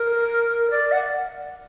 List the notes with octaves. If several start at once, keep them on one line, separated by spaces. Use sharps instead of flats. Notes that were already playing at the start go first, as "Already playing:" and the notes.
Already playing: A#4
D5
F#5